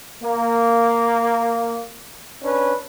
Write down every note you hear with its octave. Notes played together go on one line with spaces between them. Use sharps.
A#3
C#4 D4 B4